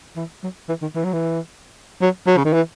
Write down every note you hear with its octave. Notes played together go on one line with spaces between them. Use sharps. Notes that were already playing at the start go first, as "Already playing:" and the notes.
E3
F#3
E3
D#3
E3
F#3
E3
F#3
F#3
C#3
D#3
E3